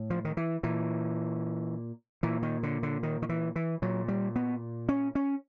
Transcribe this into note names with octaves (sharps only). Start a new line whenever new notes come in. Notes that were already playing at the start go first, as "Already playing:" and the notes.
Already playing: A2
F3
D#3
E3
A#2 E3
A#2 E3
D#3
D3
D3
D#3
D#3
E3
E3
A#2 F#3
G3
B3
C#4
C#4